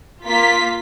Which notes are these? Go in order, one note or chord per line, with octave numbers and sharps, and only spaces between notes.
A#3 F4 B6